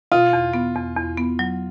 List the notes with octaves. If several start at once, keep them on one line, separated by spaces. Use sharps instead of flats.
B2 F4
E2
B3
E2
E2
B3
F#3